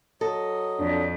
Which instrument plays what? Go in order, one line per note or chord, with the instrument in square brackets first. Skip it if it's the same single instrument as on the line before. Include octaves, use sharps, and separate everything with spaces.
[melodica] F#3 D#5 [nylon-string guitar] A4
[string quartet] F2 [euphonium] D4